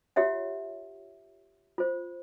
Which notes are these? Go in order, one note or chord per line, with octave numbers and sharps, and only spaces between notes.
F4 G4 C#5 E5 F#5
F4 C5